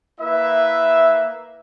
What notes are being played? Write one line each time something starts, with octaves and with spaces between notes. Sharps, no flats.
A#3 E4 B4 E5